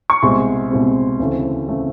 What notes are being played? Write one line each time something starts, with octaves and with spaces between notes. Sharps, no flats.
C#6
C2 B2 G#3 C4 C6
C2 B2 G#3 C4
D2 C#3 E3 A3 C4
C#3 E3 A3 C4